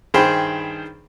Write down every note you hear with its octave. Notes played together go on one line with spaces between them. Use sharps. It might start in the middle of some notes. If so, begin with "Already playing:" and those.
G2 D#3 G#4 C5 G5 B5